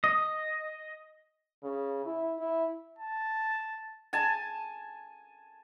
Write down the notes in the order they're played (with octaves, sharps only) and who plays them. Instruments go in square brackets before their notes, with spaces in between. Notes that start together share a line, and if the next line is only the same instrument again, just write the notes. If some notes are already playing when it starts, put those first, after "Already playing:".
[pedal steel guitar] D#5
[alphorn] C#3
E4
E4
[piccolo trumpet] A5
[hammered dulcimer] G#5 A5